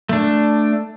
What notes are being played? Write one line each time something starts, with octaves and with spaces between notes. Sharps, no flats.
A3 D4